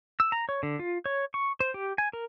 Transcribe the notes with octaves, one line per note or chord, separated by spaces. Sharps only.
E6
A#5
C#5
D3
F4
C#5
C#6
C5
G4
G#5
A#4